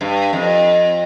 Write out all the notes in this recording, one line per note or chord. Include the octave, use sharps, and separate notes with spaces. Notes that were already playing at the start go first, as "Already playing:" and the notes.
G2
F2